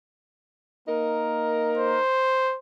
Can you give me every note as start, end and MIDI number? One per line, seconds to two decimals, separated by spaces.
0.88 1.98 58
0.88 1.98 63
0.88 1.98 70
1.77 2.57 72